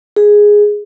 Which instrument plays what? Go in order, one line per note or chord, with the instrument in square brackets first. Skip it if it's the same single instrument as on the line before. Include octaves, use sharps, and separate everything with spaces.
[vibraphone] G#4